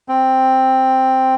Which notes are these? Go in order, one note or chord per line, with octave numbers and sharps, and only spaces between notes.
C4